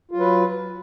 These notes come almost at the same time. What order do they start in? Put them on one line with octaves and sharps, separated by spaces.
F4 F#3 B4